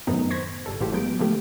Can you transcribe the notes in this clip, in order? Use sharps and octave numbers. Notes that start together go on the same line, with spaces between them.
F#2 A2 C3 D#3 B3 D#4
C5 C#6 G#6 A#6 B6
G1 G3 A4
A2 E3 A3 F4 G4
F#3 G#3 B3 G6 D7
D3 F3 A3 A#3 G4